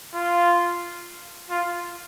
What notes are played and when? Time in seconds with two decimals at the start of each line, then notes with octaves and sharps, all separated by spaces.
0.15 F4
1.50 F4